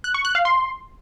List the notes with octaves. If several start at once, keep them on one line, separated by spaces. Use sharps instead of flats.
F#6
C#6
F#6
F5
C6